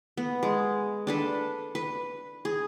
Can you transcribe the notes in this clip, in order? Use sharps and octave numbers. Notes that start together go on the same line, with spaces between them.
B3
G#3
D4 A4 B4
B4
G#4